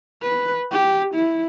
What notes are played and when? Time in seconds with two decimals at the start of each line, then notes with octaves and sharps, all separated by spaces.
0.22 B4
0.72 G4
1.15 E4